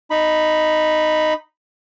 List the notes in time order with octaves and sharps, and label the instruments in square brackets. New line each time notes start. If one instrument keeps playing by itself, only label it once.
[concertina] D#4 B5